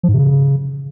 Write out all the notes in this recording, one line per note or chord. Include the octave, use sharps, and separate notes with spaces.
F3
G#2
C3
C#3